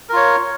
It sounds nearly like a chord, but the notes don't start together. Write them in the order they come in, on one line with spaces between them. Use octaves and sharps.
A#4 F4 C#5